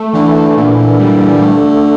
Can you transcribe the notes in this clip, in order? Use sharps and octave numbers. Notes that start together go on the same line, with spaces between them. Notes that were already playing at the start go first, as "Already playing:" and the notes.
Already playing: A3
D3 E3
A#2 D3
G3
A3